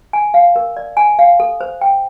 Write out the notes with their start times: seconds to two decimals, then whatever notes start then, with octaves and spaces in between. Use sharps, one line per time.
0.13 G#5
0.34 F5
0.56 A#4
0.77 D5
0.97 G#5
1.19 F5
1.40 A4
1.61 C5
1.81 G5